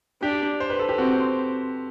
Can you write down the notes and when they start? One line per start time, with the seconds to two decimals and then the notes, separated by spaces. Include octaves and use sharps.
0.22 D4 G4
0.60 C5
0.70 B4
0.79 A4
0.89 G4
0.97 C4 F#4